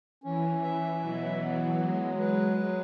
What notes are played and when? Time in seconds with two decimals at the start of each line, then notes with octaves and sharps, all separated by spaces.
0.24 E3 C#4
0.62 E5
1.02 B2 F#3
1.41 B3
1.80 F#3 G#3
2.19 B4
2.58 F#3